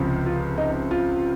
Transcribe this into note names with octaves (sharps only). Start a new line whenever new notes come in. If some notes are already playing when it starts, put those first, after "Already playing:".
Already playing: C#2 C3 F3
F4
D#4
F4